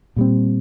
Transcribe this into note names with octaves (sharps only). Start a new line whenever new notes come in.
A#2 G3 C4